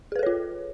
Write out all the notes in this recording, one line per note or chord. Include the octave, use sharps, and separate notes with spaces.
F4 G#4 A4 B4 C#5